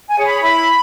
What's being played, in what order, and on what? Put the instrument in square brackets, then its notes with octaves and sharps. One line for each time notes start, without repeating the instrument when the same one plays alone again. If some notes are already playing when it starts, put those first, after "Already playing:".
[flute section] G#5
G#4 C#5
B5
E4 B5